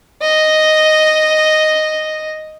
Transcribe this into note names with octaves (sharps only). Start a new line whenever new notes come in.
D#5